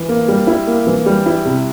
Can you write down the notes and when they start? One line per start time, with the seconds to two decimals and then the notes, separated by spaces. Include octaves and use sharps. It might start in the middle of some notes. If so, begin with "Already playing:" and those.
Already playing: E3
0.08 A#3
0.28 G3
0.47 E4
0.67 A#3
0.87 E3
1.06 G3
1.26 E4
1.45 C3